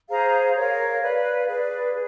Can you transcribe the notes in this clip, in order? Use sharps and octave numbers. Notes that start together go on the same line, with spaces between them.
G#4 C5 F5 A#5
A#4 C#5 F5
B4 D5 F5
G#4 B4 D5
G#4